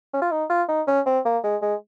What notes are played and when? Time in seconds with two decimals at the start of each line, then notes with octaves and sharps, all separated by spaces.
0.13 C#4
0.22 F4
0.31 D#4
0.50 F4
0.68 D#4
0.88 C#4
1.06 C4
1.25 A#3
1.43 G#3
1.62 G#3